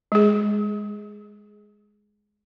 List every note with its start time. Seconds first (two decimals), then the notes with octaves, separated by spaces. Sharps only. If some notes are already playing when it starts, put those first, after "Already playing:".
0.12 G#3 G#4